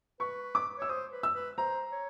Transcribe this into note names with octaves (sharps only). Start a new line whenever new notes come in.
B4 C#6
D6
C#5 E6
C5 D#6
B4
E6
B4
C5 A#5
C#5